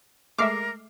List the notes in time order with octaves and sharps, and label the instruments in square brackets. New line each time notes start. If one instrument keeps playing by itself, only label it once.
[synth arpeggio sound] G#3 A3 E5 [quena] A#4 [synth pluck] D6 F6 C7